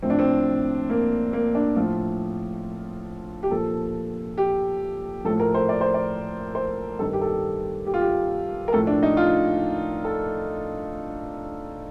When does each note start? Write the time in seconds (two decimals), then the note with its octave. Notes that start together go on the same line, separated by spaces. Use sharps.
0.02 A2 F3 C4
0.10 D4
0.19 C4
0.90 A#3
1.33 A#3
1.55 D4
1.76 A2 F3 F4
3.43 G4
3.50 A#2 F3 A4
4.38 G4
5.25 F3 A4
5.28 A2
5.40 A#4
5.54 C5
5.69 D5
5.81 C5
5.94 D5
6.55 C5
6.99 G2 D#3 A4
7.13 G4
7.21 A4
7.27 G4
7.86 G4
7.94 F4
8.01 G4
8.68 A#4
8.73 A2 F3 A4
8.87 D4
9.03 D#4
9.17 F4
10.04 A4